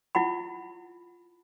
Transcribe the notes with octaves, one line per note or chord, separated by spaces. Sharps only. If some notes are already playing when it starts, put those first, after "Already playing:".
E4 F4 F#5 B5